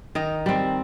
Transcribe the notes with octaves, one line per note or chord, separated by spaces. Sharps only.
D#3 D#4 D#5
G3 C4